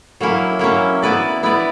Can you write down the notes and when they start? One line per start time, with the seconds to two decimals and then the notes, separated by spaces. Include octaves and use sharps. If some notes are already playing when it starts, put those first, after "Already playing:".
0.21 F#3 A#3 C#4 E4
0.59 F#3 A#3 C#4 E4
1.02 B3 E4 B4 D5
1.43 B3 E4 B4 D5